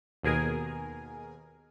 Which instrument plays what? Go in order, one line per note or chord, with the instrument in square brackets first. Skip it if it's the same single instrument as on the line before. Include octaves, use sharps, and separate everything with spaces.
[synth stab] D#2 B2 G#4 A#4 G#5